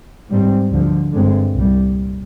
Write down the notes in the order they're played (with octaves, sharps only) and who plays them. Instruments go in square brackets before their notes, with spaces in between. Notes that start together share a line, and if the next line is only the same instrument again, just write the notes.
[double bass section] G#2 G3 C4
D2 D3 F3
G2 D3 G#3 C4
C2 A#2 G3